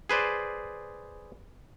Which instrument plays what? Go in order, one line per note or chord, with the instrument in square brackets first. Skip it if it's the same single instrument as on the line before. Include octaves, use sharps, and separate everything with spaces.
[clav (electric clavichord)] G#4 B4 C5 D5